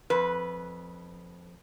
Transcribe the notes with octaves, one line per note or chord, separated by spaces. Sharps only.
F2 B4